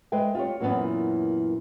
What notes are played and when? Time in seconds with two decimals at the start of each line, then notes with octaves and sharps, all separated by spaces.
0.12 G#3 B4 E5 G5
0.35 F4 G4 C#5
0.60 F#2 A#2 E3 A3 B3 C#4